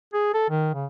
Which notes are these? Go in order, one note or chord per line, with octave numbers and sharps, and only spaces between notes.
G#4
A4
D#3
C#3